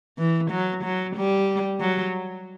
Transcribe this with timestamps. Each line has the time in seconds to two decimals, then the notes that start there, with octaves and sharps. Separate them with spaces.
0.18 E3
0.51 F#3
0.84 F#3
1.16 G3
1.80 F#3